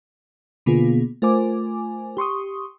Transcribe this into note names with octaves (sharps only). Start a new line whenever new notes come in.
B2 D3 A#3 B3 F4 G#4
A3 F4 A#4 C5 G#5 D6
G4 C6 C#6 D#6